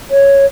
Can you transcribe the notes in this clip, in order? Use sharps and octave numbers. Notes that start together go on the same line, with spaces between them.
C#5